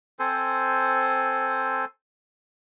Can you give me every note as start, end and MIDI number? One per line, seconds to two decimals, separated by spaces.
0.19 1.85 60
0.19 1.85 69
0.19 1.85 72
0.19 1.85 80